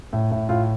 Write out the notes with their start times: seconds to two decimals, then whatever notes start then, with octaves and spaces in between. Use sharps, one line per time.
0.13 A2
0.31 A2
0.49 A2 F4